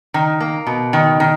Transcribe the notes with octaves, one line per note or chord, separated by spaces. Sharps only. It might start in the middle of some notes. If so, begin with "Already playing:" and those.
D#3
A#3
B2
D#3
D#3